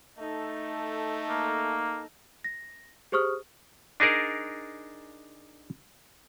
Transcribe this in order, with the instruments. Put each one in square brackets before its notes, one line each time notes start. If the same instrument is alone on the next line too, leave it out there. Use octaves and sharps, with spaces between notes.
[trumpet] A3 [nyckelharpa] D#4 A4
[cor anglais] A#3
[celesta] A#6
G4 G#4 C5 C#6 D#6 F6
[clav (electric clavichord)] D4 D#4 G#4 A#4 D5